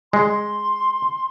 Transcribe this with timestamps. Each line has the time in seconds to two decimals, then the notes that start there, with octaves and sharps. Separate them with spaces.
0.13 G#3 C6